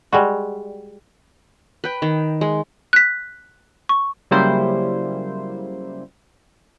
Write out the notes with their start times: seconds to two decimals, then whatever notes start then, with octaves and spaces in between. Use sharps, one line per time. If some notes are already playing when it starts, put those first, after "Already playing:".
0.13 G3 G#3 F#4
1.84 B4 G5
2.02 D#3
2.41 G#3
2.93 F#6 B6
3.89 C#6
4.31 C#3 F#3 G3 A#3 E4 C5